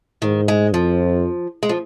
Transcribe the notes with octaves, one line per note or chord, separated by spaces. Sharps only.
G#2 D#3
G#3
F2 F3
G#3
F3